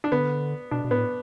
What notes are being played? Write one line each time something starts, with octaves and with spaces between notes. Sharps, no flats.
D4
D3 B3
B2 D4
B2
A2 B3